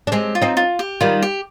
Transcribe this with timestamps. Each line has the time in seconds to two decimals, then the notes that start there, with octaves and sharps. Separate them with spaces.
0.07 D4
0.12 G#3 C4 G4
0.35 F4
0.42 C4 D#4
0.57 F4
0.79 G4
1.01 D#3 G3 F4
1.22 G4